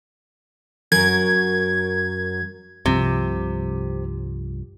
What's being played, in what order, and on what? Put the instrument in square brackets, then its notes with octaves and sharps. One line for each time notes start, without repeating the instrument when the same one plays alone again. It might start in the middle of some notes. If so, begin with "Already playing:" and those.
[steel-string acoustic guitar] F#2 F#3 A#4 [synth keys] G#6
[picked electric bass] C2 G2 F3 [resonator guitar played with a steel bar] C3